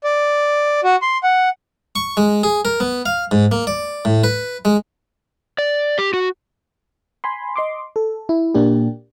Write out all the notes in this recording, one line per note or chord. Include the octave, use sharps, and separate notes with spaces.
D5
F#4
C6
F#5
C#6
G#3
G#4
A#4
B3
F5
G#2
A#3
D5
A2
B4
G#3
D5
G4
F#4
G#5 B5 C6
D#5 C6 D6
A4
E4
A#2 A#3 D4 G4